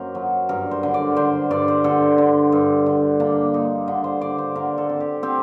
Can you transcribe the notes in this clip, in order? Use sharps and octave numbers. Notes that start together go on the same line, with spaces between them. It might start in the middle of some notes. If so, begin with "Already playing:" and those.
Already playing: F#2 A#3 D#4 F#4 A#4 C5
F#3
G2 A#4
C5
D3
D5
D3 C5
G2 D5
C5
D3 A4
D3
G2
D3
A#3 D4
A#3 D#4
D3
C5
D3 D5
C5
D3 A#4
A4
C4
G4
C4 G4